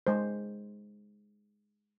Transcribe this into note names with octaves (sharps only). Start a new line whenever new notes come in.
G#3 C5